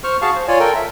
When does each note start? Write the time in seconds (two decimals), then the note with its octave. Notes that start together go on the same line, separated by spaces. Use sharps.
0.04 C5 C#6 F6
0.21 F#4 G#4 F5 A5 C#6
0.36 C5
0.48 F4 C#5 D5 G#5
0.60 A4 A#4 G5
0.75 E5